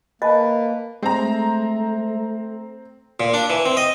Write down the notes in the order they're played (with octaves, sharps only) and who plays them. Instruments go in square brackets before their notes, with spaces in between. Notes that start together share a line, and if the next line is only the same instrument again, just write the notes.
[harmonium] A#3 [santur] B4 [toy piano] D#5 A5
[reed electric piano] G#3 [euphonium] A3 [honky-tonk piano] C4 A#5
[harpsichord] A#2
D4
E3
C4
D#5